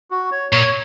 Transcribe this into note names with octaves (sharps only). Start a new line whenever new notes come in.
F#4
C#5
A#2 C#5